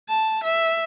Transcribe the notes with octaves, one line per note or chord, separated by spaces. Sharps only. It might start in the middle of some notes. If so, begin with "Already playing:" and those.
A5
E5